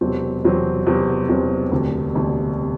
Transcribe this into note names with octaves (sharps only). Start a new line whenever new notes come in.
E1 E2 C3 F#3 C4
E1 E2 C3 F#3 C4
E1 E2 C3 F#3 C4
E1 E2 C3 F#3 C4
E1 D2 C3
E1 D2 C3
C3